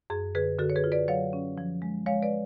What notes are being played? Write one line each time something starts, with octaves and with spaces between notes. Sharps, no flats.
F#2 G#4
D3 G#4 B4
D3 F#4 A4
C#5
G#4 B4
F4
B4 D5
F#3 C#5 F5
C#4
F3
G#3
G#3 C#5 F5
B4 D5